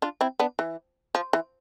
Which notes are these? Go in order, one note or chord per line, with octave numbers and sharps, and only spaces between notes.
D4 F4
C4 E4
B3 D4
E3
F3
E3